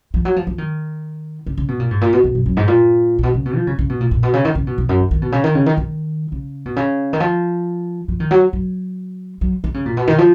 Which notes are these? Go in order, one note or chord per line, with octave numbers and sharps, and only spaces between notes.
F3
F#3
F3
F3
D#3
C#3
C#3
B2
A#2
G#2
A#2
B2
B2
F#2
F#2
G#2
A#2
A#2
B2
C#3
B2
F3
C#3
C#3
B2
A#2
A#2
B2
C#3
D#3
C#3
B2
F2
F#2
D#3
D#3
B2
C#3
D#3
C#3
D#3
D#3
C#3
B2
C#3
D#3
F3
F3
D#3
F#3
F#3
F#3
D#3
C#3
A#2
B2
D#3
F3